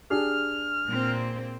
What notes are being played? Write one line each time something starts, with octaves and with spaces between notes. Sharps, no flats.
D4 G4 G#4 F6
A#2 A#3 C4